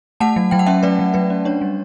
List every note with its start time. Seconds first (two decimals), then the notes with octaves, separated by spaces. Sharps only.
0.20 A3 F#5 A5
0.36 F#3
0.51 F#3 G5
0.59 F#5
0.66 C#4 E5 G5
0.83 A3 B4 D5
0.99 F#3
1.14 F#3 B4
1.30 C#4
1.45 D4 C#5
1.61 G3